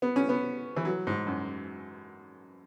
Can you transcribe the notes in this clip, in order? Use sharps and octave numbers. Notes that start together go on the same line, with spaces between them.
B3
C#4
B3
E3
F#3
G#2
F#2